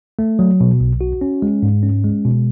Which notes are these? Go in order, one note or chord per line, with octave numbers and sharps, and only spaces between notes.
A3
F#3
B2
B1
F#4
C#4
G#3
G#2
C#4
G#3
B2